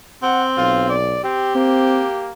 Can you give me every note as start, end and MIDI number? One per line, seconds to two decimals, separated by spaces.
0.23 0.93 60
0.23 0.45 78
0.57 1.20 35
0.57 0.87 65
0.89 1.20 74
1.24 1.55 60
1.24 2.32 67
1.55 2.33 58
1.55 2.05 60